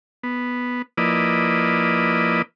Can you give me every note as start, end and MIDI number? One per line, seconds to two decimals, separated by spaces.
0.23 0.82 59
0.98 2.42 53
0.98 2.42 58
0.98 2.42 64
0.98 2.42 71
0.98 2.42 74
0.98 2.42 75